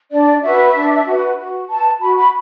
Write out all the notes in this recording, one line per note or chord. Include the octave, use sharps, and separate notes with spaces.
D4 D5
F#4 B4 E5
D4
F#4 B4
F#4
B4 A5
F#4 B5
B5